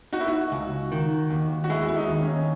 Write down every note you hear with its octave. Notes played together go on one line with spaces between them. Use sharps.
D#4 F#4
E4
F#4
C#2
D#3
D#2
F#4
G#3 E4
F#4
E4
D#4
D#2
C#4